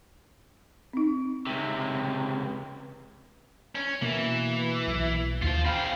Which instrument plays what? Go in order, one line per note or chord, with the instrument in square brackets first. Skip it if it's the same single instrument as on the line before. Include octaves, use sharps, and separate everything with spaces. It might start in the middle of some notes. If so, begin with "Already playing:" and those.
[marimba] C4 D#4
[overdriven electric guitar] C#2 C3
[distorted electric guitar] C#4
[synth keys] B2 A#3 [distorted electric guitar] E3
[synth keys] B1
[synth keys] D#2 [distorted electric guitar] F4 C5
[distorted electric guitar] C4 G#4 [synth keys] F5 G5 B5